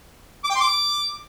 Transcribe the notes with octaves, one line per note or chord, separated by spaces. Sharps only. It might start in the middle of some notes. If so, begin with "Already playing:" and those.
D6
G5
C6
D6